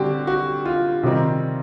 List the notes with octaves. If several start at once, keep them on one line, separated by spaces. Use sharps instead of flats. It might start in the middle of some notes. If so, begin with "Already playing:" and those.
Already playing: D3 G3 C4 F#4 G4
F#4
F4
C3 D#3 G3 C4 D#4